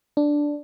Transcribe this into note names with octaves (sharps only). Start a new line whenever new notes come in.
D4